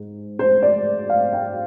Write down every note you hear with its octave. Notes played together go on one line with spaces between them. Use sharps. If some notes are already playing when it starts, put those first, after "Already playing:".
Already playing: G#2
C5
D5
F5
G5